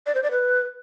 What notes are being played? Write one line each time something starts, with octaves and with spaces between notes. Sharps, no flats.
D5
C5
D5
B4